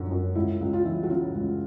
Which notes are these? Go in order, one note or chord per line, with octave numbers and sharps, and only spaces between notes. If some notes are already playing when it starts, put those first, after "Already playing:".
Already playing: F#2 D3 F3 F#4
F#2
C#2 E4
C#2
F4
E3 E4
F#4
C#3 F4
C#2